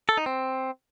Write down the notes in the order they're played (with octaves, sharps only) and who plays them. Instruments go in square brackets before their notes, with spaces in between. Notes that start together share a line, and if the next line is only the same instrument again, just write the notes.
[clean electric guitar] A4
D#4
C4